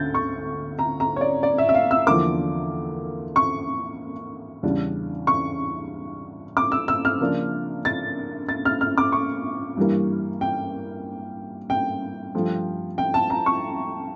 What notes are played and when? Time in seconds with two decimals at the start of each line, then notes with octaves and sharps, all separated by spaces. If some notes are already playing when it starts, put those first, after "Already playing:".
Already playing: D2 D3 C#4 G6 A6
0.14 C#6
0.79 A#5
1.00 A#5
1.16 C#5
1.21 D5
1.43 D5
1.58 E5
1.69 E5
1.74 F5
1.91 E6
2.06 E2 D3 F3 A#3 D6
3.36 C#6
4.63 E2 C#3 G3 D4
5.27 C#6
6.57 D6
6.72 E6
6.88 E6
7.05 F6
7.21 C#3 F3 A#3 D4
7.85 A6
8.49 A6
8.65 F6
8.81 F6
8.98 D6
9.12 C#6
9.77 G2 E3 G3 A#3
10.41 G5
11.70 G5
12.35 G2 F3 A3
12.98 G5
13.14 A5
13.30 A#5
13.46 C#6